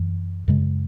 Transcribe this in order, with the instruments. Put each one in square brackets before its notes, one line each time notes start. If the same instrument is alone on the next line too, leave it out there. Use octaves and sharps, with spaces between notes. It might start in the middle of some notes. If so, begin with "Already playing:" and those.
Already playing: [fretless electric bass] F#2 E3
F#2 C#3 G#3